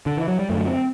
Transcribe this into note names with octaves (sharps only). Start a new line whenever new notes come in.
D3
E3
F#3
G3
F#2 D3 A3
C4